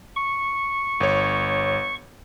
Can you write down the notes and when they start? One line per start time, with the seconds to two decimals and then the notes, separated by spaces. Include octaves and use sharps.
0.16 C#6
1.00 G1 C#5